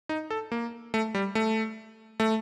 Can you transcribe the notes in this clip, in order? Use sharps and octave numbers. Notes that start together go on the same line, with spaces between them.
D#4
A4
A#3
A3
G3
A3
A3